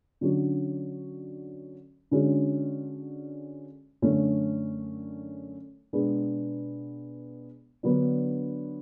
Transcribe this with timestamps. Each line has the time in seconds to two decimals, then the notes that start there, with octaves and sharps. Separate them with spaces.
0.21 D3 F#3 C#4 F#4
2.11 D3 G#3 C#4 F#4
4.02 F#2 D3 A3 C#4
5.93 B2 G#3 B3 D4
7.83 D3 F#3 B3 D4